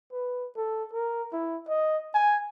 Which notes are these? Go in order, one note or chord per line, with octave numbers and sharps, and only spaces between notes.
B4
A4
A#4
E4
D#5
G#5